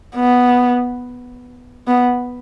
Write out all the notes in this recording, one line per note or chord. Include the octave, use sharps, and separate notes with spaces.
B3
B3